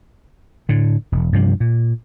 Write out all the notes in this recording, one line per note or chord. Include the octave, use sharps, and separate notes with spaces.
A2 D3
E1
G2 C3 F3
A#2